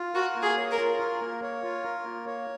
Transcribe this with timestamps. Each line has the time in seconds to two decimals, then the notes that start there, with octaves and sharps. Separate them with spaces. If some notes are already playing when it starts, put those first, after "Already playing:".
Already playing: F4
0.14 F#4 A#4
0.35 A#3
0.43 G#4
0.57 C#5
0.71 A#4
0.79 F4
0.99 A#4
1.21 A#3
1.42 C#5
1.63 F4
1.84 A#4
2.04 A#3
2.26 C#5